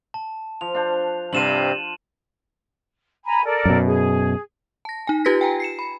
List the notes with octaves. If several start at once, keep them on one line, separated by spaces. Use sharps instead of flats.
A5
F3 F7
D4 F4 C5
G2 C3 D4 F4 C5 D#7 E7 F#7
G#5 A#5 B5
A4 A#4 D5
F#2 B2
G#4
A5 A#6
D#4 G#5
F4 G4 B4 G#6 A#6 B6
G5 G#5 A#5
C7 C#7 E7
B5